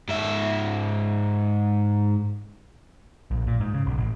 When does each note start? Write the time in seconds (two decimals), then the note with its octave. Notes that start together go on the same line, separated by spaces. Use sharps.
0.09 G#2 E5
3.31 A#1
3.47 A#2
3.60 G#2
3.74 C#3
3.87 B1
3.98 A1